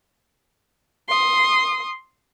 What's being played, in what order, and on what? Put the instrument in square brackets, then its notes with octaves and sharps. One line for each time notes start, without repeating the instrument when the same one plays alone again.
[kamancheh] C6 D#6